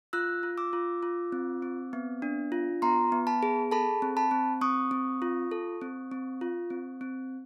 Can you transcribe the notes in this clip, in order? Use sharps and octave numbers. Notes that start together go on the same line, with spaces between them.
F4 E6 F#6
F4
D6 E6
F4
F4
C4
C4
B3
D4
F4
B3 A#5 C6
B3
A5 B5
G#4
A4 A5 B5
C4
A5 B5
C4
C4 C#6 D#6
C4
F4
A4
C4
C4
F4
C4
C4